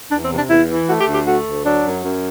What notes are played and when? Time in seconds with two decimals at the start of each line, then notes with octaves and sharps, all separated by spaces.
0.12 E2 D4
0.25 C4
0.31 C3
0.37 D4
0.50 E2 E4
0.70 E3
0.89 A3 F#4
1.01 G4
1.07 D2
1.14 G4
1.27 A3 F#4
1.46 D2
1.65 F#3 D4
1.85 F#2
2.03 F#2